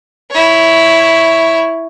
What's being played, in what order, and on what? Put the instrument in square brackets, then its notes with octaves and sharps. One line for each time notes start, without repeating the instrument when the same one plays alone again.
[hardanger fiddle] E4 C#5